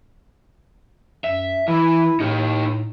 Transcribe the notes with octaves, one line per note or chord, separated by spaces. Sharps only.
F#2 E5
E3 E4
A2 D#4 G4